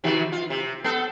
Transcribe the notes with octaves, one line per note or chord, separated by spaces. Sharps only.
C3 D#3 F#4
F4
C3
B3 A4